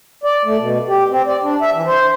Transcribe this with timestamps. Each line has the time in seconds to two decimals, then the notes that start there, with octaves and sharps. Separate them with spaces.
0.24 D5
0.45 A3
0.58 B2
0.88 G4
1.09 C4
1.26 D5
1.43 D4
1.61 E5
1.73 E3
1.87 C5